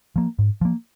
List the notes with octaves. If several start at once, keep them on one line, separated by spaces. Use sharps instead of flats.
F3 A#3
G#2
F3 A#3